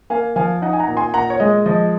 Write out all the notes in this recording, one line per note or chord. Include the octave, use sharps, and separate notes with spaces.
A#3 F5 G#5
F3 F5 G#5
D#4 D#5 F#5
G#5
F#5 A#5
A#2
G#5 C6
A#2 F#5 A#5
C#5
G#3 D#5
F3 D#5